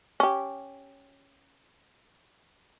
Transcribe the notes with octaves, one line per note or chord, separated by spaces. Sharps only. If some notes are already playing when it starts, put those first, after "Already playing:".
C#4 G4